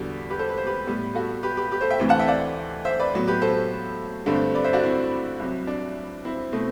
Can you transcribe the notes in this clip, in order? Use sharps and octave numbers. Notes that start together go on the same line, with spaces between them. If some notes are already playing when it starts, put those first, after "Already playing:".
Already playing: E2 D3 G3 F#4
G4 B4
A4 C5
B4
C5
G4 B4
A2 G3 B3
F#4 A4
G4 B4
G4 B4
G4 B4
A4 C5
E5 G5
D2 C3 E3 A3 C4
F#5 A5
E5 G5
D5 F#5
C5 E5
B4 D5
A2 F#3 B3
G4 B4
A4 C5
G2 D3 A3 C4
B4 D5
C5 E5
D4 F#4
C4 E4
C2 C3 F#3
D4
C4 E4
B2 A3 C4